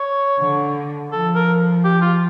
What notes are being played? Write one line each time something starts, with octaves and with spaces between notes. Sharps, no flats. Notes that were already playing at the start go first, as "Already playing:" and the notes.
Already playing: C#5
D3
F3 A4
A#4
G4
F4